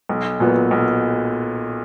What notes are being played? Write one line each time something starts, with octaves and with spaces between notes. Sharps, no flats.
B1
A#2 F#3 B3
B1